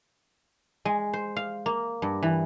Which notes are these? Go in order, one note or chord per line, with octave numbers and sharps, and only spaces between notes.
G#3
C5
F5
A#3
G2
E3